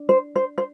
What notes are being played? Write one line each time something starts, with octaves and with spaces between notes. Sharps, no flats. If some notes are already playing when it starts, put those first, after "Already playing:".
Already playing: D4
C5
C5
C5